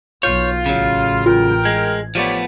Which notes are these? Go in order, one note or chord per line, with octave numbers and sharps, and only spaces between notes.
B1 F4 C#5 G6
A1 C#3 F#3
F4 A#4 G5
G#3 G#6
F3 A3 B3 G4 C#5 D5